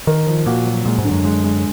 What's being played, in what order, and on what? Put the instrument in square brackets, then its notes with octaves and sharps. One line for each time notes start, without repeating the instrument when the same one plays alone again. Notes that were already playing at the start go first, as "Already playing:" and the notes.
[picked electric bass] D#3 [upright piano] A#4
[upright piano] F3
[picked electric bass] A#2 [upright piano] F#4
[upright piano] F#3
[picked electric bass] A#2 [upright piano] G#3
[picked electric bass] G#2
[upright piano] D3
[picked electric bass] F#2
[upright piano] G#3
G#3